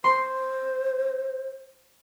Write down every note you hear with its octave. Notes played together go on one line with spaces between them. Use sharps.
C5 C6